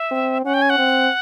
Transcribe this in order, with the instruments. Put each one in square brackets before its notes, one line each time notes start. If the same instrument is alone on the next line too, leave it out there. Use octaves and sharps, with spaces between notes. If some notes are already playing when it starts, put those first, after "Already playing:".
Already playing: [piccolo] E5
[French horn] C4
[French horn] C#4 [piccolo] F#5
[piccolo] G5
G#5
F#5
[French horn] C4